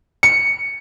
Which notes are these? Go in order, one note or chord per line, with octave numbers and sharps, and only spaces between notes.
C#7